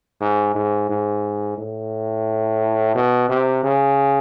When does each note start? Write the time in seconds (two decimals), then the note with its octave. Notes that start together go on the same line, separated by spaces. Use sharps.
0.21 G#2
0.55 G#2
0.89 G#2
1.58 A2
2.95 B2
3.29 C3
3.64 C#3